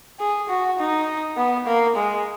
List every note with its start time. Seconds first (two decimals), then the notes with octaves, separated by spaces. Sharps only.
0.20 G#4
0.49 F#4
0.79 D#4
1.37 B3
1.66 A#3
1.96 G#3